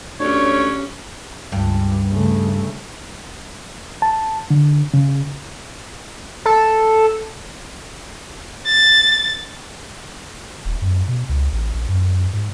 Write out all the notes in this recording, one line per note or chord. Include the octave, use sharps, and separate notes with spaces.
D2 C#4 D4 G4 C#5
C#2 G2
C#3 A3
A5
D3
C#3
A4
A6
D#1
F#2
B2
C#2
A1
A#1
F#2
G#2